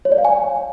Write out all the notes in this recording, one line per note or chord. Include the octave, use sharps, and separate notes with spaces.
C#5
D5
F5
G#5